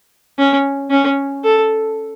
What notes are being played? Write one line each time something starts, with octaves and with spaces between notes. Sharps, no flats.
C#4
C#4
A4